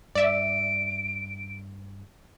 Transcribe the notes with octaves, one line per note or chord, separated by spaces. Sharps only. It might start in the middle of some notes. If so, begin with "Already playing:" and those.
G2 D5 E5 D7